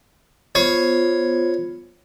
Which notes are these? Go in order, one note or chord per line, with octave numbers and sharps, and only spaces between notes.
B3 F4 C5 C#5